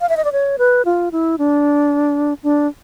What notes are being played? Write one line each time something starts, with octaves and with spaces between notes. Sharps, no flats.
F5
E5
D#5
D5
C#5
B4
F4
E4
D4
D4